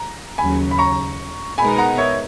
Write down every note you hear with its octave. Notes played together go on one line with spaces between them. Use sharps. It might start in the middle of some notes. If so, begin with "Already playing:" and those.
Already playing: A#5
D#2 C#3 F#3 G#5 B5
B5
A#5 C#6
B2 G#3 B3 D#4 A#4 G#5 B5
F#5 A#5
C#5 E5